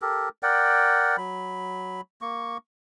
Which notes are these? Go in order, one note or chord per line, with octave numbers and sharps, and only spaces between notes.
G4 A4 A#4
A#4 D5 F#5 G5
F#3 B5
A#3 C#6